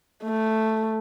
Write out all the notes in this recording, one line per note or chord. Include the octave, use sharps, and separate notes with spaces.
A3